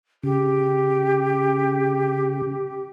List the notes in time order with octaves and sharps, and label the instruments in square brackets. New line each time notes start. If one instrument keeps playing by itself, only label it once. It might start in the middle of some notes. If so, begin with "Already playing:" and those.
[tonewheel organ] C#3 [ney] G4